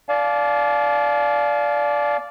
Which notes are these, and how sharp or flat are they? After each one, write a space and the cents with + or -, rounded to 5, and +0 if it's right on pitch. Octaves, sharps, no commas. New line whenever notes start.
D5 -10 F5 +0 A5 -45